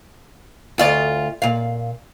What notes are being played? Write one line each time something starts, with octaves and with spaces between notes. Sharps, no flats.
D2 F4 D5
A#2 F5